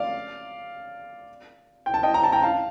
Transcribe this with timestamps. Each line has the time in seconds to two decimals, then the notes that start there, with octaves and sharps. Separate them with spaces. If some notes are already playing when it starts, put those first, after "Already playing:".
Already playing: D5 F5
1.86 G5
1.94 A5
2.03 D#5 G5
2.14 A#5
2.24 A5
2.32 G5 A#5
2.42 F5 A5